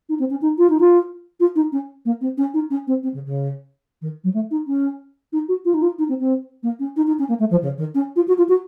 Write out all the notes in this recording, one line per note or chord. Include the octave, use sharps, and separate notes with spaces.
D#4
C4
C#4
D#4
F4
D#4
F4
F4
D#4
C#4
A#3
C4
C#4
D#4
C#4
C4
C4
C#3
C#3
D#3
F#3
A3
D#4
C#4
D#4
F#4
F4
D#4
F4
D#4
C4
C4
A#3
C#4
D#4
D#4
C#4
A#3
A3
F3
C#3
D#3
C#4
F4
F#4
F4
F#4